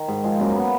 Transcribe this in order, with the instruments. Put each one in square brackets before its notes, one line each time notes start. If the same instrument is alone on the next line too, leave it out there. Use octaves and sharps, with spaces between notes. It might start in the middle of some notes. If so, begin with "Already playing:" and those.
Already playing: [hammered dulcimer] D#3
G#2
F3 G#3
F#2 A#3
B3